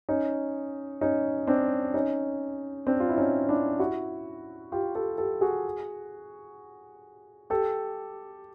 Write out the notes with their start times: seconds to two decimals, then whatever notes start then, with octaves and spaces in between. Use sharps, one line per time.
0.09 C#4 D#4
1.01 C#4 D#4
1.47 C4 D4
1.94 C#4 D#4
2.87 C4 D4
3.00 F4
3.09 E4
3.18 C#4 D#4
3.49 D4 E4
3.79 E4 F#4
4.72 F4 G4
4.95 G4 A4
5.18 G4 A4
5.41 F#4 G#4
7.50 G4 A4